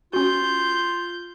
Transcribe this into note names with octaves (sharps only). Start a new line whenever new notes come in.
C#4 F4 F#4 G6